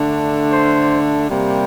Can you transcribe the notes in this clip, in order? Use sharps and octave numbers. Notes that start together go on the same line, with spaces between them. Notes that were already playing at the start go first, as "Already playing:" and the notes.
Already playing: D3 A3 D4
C5
C3 G3 A#3